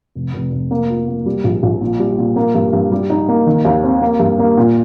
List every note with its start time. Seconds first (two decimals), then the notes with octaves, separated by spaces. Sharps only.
0.15 F1
0.34 F1
0.52 F1
0.71 A#3
0.90 F4
1.08 A#3
1.26 G3
1.44 A#1
1.63 A#1
1.81 A#2
2.00 G3
2.18 A#2
2.36 A#3
2.55 G2
2.73 G2
2.92 G3
3.10 D#4
3.28 A#3
3.47 D#3
3.65 D#2
3.83 C4
4.02 A#3
4.20 G2
4.39 A#3
4.57 A#2